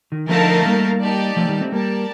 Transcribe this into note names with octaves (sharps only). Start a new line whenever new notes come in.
D#3
D3 F3 A3 D#4 A#4 F5 A5
G3 A#3
D#4 G4 D5 A5
F3 A3
D#3 G3
A3 C4
G3 A#3 G4 A#4 D5 A5